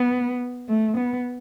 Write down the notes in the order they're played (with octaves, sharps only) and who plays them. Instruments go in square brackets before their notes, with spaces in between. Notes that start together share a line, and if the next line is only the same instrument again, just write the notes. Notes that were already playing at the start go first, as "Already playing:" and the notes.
Already playing: [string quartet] B3
A3
B3